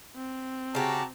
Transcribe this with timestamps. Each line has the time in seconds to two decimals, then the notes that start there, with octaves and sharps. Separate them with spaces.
0.16 C4
0.75 C#3 F#4 G4 A5 A#5